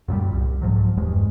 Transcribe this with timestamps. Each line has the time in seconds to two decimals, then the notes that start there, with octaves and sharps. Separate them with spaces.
0.08 F#2 A#2 F#3 G3
0.33 C2
0.62 G#2 F3 F#3
0.97 F#1 E2 G2 G#3